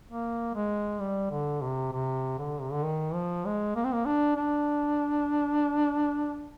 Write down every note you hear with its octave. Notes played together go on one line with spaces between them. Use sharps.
A#3
G#3
G3
D3
C3
C3
D3
C3
D3
D#3
F3
G#3
A#3
C4
A#3
D4
D4